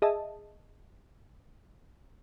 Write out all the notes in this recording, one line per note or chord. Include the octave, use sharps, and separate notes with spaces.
G#4 D#5 E5 A5